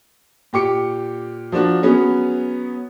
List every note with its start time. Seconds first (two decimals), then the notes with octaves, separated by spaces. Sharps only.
0.53 A#2 G4 D6 C#7
1.52 F3 A#3 D4 F#4
1.83 F#3 B3 C#4 G#4